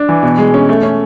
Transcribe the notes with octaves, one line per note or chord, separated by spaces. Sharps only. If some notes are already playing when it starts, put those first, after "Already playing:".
Already playing: D4
E3
B2
G#3
C#4
A3
C#4